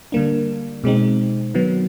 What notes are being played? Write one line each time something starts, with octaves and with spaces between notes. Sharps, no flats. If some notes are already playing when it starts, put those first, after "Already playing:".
D3 G3 A#3 D4
B2 G#3 C4 D#4
D#3 F#3 B3